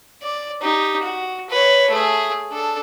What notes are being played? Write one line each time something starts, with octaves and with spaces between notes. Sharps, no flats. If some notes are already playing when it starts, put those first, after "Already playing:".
D5
D#4 G4
F#4
B4 C#5
A3 G#4
D4 A4